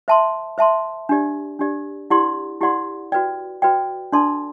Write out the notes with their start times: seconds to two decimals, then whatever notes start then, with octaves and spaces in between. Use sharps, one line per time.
0.08 C5 E5 A5 C6
0.58 C5 E5 A5 C6
1.09 D4 G4 D5
1.59 D4 G4 D5
2.10 E4 G4 D5 F#5 C6
2.61 E4 G4 D5 F#5 C6
3.12 F#4 B4 D5 G5
3.62 F#4 B4 D5 G5
4.12 D4 A4 D5 A5 C6